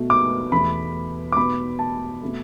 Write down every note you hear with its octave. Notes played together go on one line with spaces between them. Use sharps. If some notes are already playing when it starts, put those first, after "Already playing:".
Already playing: B2 A3
D6
E2 B2 A3 B5
D6
B2 B3 B5
A5
B2 A3